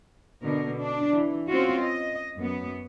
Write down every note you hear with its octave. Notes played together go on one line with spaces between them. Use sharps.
B2 D3 A#4
D4
E3
C4 C#4 F4 F#4
D#5
F#2 B3